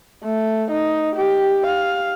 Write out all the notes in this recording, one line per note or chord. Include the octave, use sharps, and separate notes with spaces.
A3
D#4
G4
F5